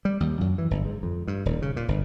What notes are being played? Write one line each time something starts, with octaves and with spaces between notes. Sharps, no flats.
G3
D#2
F#2
E3
G1
G#2
F2
G2
D#1
C#3
A#2
G1